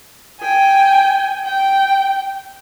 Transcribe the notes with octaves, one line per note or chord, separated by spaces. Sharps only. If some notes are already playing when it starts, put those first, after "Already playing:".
G5 G#5
G5